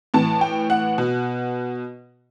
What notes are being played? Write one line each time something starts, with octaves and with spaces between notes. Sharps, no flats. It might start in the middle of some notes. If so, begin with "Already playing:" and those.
A2 E3 A5
G5
F#5
B2